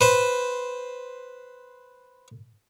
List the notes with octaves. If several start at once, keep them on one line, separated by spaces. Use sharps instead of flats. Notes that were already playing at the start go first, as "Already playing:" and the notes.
B4 C5